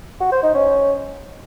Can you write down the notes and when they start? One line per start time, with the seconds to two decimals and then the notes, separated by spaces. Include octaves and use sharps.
0.20 F#4
0.31 C5
0.43 D#4
0.54 C#4